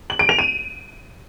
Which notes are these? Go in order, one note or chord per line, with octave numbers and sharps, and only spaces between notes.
F#7
D7
F7
D#7